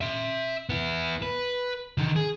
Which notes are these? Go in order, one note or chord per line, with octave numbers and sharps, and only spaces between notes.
E5 C6
B3 E4
B4
D3 D#3
G#4